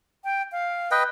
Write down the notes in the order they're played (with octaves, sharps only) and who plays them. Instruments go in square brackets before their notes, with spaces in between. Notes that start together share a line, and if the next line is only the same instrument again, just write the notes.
[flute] G5
F5
[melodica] B4 D#5 G5